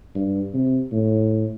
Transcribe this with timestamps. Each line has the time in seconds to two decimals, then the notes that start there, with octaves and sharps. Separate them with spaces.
0.15 G2
0.54 C3
0.92 A2